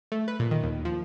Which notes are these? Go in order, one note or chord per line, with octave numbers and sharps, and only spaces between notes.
A3
B4
A#2
D#3
D#2
F3